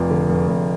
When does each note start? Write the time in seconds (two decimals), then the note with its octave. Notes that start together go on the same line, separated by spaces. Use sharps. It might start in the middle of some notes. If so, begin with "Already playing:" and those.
Already playing: F1 F2
0.10 D3
0.29 F1
0.48 F1